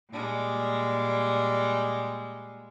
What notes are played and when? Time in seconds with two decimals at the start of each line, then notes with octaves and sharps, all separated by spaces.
0.11 A#2 G3 G#3